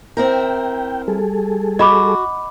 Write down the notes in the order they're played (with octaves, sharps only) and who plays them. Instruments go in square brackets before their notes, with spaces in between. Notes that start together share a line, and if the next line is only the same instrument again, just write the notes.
[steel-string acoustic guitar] C4 E4 A#4 [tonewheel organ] G5
[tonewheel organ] G3 G#4 A4
[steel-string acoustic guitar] F#4 [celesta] D#5 B5 D6